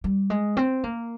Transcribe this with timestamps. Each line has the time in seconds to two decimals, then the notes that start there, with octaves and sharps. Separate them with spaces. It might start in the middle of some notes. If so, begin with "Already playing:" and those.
0.04 G3
0.30 G#3
0.57 C4
0.84 A#3